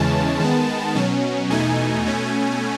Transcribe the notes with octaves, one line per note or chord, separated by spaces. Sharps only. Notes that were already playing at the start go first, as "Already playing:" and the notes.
Already playing: E2 C#3 E3 G#3 C#4 A5
D#3 G#3 B3
B2 F#3 C#4
E2 B2 A3 D#4 G#5
B2 A3 C#4